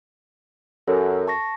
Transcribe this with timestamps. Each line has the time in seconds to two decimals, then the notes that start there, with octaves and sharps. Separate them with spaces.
0.88 F#2 A4
1.27 A5 C#6 A#6